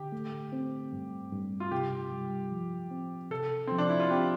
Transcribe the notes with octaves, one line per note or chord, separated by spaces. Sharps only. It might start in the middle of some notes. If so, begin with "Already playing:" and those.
Already playing: D3 G4
A3
C4
G2
G2
F4
C3 G4
G3
F3
C4
C3 A4
F3 C4
D4
E4
F4
C4 G4